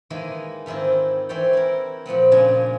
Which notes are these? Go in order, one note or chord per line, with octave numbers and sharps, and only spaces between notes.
D#3 E3 G#3 A#3
G#2 D#3 C4 E4 F4
E3 C4 C#5 D5 G5
E4 A#4
A#2 F3 B3 C4
A#2 C#3 G#3 D4 G#5